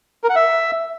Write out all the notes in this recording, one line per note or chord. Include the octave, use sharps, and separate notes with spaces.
A#4
F#5
E5